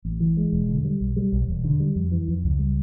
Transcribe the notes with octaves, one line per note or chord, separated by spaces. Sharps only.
A1
E3
G#3
E1
D3
G3
B1
G3
B1
E1
D3
G3
F2
E3
F2
C#2
G3